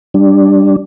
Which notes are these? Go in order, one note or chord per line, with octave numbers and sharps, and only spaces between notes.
G3 D4